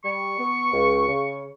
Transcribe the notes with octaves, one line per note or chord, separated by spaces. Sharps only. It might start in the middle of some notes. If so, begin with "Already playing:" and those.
G3 C#6
B3
C#2
C#3